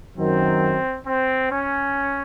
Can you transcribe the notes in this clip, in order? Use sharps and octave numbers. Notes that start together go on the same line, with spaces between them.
F#2 D#3 F#3 C4
C4
C#4